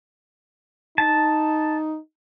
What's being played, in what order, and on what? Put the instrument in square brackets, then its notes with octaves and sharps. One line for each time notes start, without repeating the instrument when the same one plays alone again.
[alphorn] D#4 [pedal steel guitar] A5